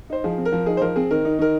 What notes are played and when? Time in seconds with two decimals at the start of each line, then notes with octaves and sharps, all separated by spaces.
0.10 D#4 C5
0.24 F3 G#4
0.38 C4
0.45 A#4
0.52 F3
0.66 D#4 G#4
0.77 C5
0.81 F3 A#4
0.96 C4 G#4
1.11 D#3 A#4
1.25 D#4
1.39 D#3 A#4